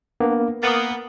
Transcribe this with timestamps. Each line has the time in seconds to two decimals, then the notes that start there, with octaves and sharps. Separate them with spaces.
0.20 A#3 B3 D4
0.63 A#3 B3 D#6 A6